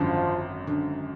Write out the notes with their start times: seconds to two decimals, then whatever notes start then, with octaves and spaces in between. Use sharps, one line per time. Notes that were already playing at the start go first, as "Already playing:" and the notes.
Already playing: G#1 F#2 D3 F3
0.67 D3